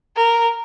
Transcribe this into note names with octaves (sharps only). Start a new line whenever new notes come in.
A#4